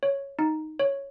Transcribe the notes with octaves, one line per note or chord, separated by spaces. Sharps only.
C#5
D#4
C#5